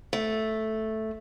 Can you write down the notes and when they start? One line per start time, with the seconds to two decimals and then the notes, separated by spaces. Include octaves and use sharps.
0.13 A3